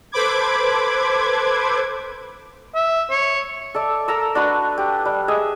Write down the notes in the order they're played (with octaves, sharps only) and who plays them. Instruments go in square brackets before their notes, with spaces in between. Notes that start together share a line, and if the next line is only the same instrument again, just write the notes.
[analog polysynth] A4 B4 C5 B5 D6 G#6
[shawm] E5
C#5
[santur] A4 D5 E5
A4 A#4 A#5 E6
D4 F#4 B4
G4
G3
G#4 D#5 E5